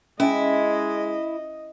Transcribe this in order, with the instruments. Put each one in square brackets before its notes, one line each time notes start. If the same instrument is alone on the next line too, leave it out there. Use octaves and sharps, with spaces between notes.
[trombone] G#3 [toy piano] C#4 G#5 [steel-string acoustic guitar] E4 [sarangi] D#5